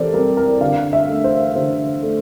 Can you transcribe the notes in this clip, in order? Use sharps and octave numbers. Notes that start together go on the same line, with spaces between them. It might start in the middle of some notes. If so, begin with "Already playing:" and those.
Already playing: E3 C4 G4 A4 A#4 C5 D5
G3 C4 A#4
A#4
D3 F5
E5
A3 D4
C5
D3 C5
A3 D4